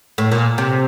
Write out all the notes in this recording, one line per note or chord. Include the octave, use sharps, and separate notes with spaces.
A2
A#2
C3